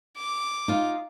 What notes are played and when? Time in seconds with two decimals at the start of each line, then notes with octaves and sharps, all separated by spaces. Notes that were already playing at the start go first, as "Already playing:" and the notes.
0.17 D6
0.68 D#4 F4